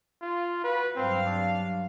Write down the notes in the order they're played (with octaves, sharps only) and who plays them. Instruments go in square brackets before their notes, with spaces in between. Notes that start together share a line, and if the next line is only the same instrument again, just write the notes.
[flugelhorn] F4
[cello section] F#4 [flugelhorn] B4
[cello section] G2 F#3 F5 [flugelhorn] C4
[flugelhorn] D4